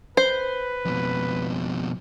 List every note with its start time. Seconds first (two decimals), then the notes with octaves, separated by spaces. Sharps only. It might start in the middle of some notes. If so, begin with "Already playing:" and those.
0.17 B4 C5
0.85 F2 B2